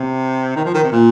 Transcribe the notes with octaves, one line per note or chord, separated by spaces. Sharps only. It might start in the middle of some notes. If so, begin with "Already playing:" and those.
Already playing: C3
D#3
F3
D#3
C3
A#2